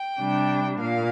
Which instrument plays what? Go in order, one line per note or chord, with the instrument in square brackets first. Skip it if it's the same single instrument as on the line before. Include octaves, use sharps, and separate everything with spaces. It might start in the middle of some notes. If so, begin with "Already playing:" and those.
Already playing: [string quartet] G5
C3 G3 D4
A#2 A#3 F5